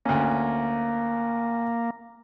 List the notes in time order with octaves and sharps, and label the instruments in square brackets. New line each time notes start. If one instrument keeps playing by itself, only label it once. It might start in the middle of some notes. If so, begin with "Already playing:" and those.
[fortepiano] D2 C#4 [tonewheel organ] A#3